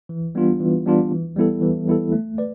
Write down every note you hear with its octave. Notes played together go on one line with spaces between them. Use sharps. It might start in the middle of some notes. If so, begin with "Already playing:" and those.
E3
G3 B3 D4 F4
E3
G3 B3 D4 F4
E3
G3 B3 E4 A4
E3
G3 B3 E4 A4
A3
B4 D5